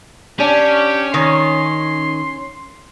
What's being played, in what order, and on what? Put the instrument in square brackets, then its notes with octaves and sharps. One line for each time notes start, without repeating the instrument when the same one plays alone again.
[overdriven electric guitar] C#4 [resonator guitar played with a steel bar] D4 [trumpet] G4
[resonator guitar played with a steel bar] D#3 [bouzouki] C#5 [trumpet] C6